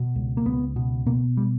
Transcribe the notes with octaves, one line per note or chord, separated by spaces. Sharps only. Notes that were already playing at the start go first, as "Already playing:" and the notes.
Already playing: B2
C#2
A#3
C#2 B3
B2
B2 A#3
G3